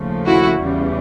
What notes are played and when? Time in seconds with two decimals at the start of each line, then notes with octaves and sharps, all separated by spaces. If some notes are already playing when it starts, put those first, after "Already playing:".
Already playing: D#2 C#3 F3 A3
0.25 E4 F#4
0.59 E2 C#3 E3 G3